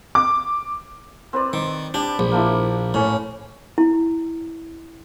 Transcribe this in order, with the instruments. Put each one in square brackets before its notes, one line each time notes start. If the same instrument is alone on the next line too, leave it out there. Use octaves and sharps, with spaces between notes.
[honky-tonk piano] D6
[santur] C4 B4 D5
[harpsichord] D#3
[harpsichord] D4 [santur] G4
[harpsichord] A#1
[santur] A#3 D4 E4
[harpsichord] A2 [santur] C#4 C#5
[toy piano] E4